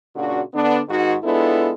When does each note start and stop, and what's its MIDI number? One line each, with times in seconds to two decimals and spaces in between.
0.15 0.41 46
0.15 0.41 49
0.15 0.41 62
0.15 0.41 66
0.54 0.80 50
0.54 0.80 59
0.54 0.80 62
0.88 1.15 44
0.88 1.15 51
0.88 1.15 66
1.23 1.71 56
1.23 1.71 59
1.23 1.71 62
1.23 1.71 64
1.23 1.71 65
1.23 1.71 69